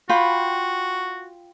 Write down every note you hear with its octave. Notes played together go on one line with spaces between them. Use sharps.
F4 F#4 G5 B5